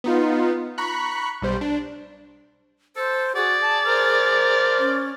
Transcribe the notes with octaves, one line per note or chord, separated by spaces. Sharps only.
B3 D#4 F4
A#5 B5 C#6 F#6
B1 G3 C5
D4
A4 C5
F#4 G#4 D5
A5
A#4 C5 F6
C#4